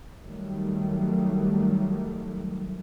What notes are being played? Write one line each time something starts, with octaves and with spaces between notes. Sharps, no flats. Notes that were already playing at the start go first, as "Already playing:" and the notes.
D#3 F#3 G3 A3